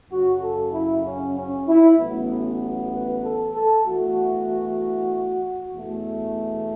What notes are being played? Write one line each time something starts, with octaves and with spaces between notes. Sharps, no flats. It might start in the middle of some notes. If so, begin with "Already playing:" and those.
F#2 C#3 F#3 F#4
A4
E4
C#4
C#4
E4
A1 A2 F#3 B3
B4
A4
A4
E2 E3 A3 F#4
E2 B2 A3